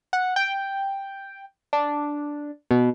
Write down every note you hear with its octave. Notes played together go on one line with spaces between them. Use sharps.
F#5
G5
D4
B2